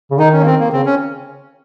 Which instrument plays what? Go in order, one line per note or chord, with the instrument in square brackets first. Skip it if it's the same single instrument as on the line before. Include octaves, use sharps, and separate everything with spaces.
[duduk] C#3
[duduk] D#3 [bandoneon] D#4
[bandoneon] C#4
A#3
C4
A#3
[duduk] C#3 [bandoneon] C4
[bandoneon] C#4